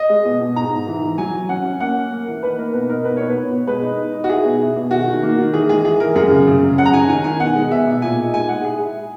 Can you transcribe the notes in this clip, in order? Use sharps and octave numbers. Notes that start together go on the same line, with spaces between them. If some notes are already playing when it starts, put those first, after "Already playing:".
Already playing: D#5
G#3
B2
B2
G#2 A#5
G#2
E3
E3
F#3 G#5
F#3
C#4 F#5
C#4
A#3 F#5
A#3
A#3
E3
D#4 B4
A#3 A#4
B2 B4
D#4 A#4
B2 B4
B2 C#5
B4
B2
B2
G#3 B4
D#4
D#4
D#4
F#4
E4 G#4
B2
E4
B2
D#3 F#4
D#3
A#3
D#3
E3 G#4
G#3 G#4
E3 G#4
E3 A#4
F#2 G#4
C#3
C#3
F#2
C#4 F#5
A#5
D#3 G#5
D#3 G#5
D#3 G#5
B2 F#5
G#3
B2 E5
B2
A#2 G#5
D#4
G#3 G#5
G#3 F#5
E4 G#4
E4